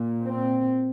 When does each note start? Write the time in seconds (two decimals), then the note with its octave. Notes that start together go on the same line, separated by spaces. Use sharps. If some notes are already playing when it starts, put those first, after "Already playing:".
Already playing: A#2
0.23 C4